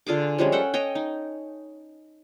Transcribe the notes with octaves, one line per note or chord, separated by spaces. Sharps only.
D3 F4 G#4 D6
F3 G3 G#3 C#4
A4 F#5 G5
C#5 D#5 G5
D#4